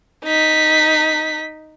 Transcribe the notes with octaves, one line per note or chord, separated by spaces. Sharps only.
D#4 B6